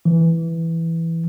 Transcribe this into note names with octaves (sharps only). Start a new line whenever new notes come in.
E3